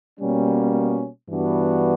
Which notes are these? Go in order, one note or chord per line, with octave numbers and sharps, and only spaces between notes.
B2 G3 A#3 C#4
G2 E3 B3 D4 F#4